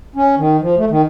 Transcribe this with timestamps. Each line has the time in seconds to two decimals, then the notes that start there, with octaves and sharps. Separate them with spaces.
0.16 C#4
0.38 D#3
0.61 F3
0.78 A3
0.90 D#3